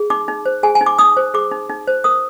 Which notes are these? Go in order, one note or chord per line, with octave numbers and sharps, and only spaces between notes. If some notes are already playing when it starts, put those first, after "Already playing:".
Already playing: G#4
D#4 D6
D#4
C5
G#4 G#5
G#5
D#4
D6
D#4 D#6
C5
G#4 D6
D#4
D#4
C5
A#4 D#6